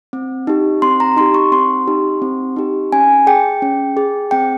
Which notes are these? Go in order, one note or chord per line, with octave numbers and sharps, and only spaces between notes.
C4
D#4 G4
C4 C6
A#5
D#4 G4 C6
C#6
C4 C6
D#4 G4
C4
D#4 G4
C#4 G#5
G#4 G5
C#4
G#4
C4 G5